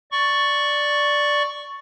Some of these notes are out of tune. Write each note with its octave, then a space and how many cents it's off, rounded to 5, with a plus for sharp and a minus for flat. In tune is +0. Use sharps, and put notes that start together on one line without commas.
D5 +0 C#6 +0